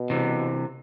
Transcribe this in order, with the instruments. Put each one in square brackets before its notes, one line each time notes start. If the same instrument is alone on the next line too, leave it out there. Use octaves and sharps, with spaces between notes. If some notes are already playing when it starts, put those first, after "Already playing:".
Already playing: [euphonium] B2
[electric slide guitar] C3 E3